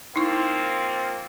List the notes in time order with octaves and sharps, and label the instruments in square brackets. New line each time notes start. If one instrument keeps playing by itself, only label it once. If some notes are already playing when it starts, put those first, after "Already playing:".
[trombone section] F3 A#3 C4 [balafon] D#4 E4 C#6